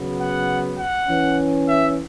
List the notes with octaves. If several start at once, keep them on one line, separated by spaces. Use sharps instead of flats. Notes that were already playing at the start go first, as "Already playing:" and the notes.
Already playing: C#3 F#3 B3
F#5
F#5
E3 C#4
E5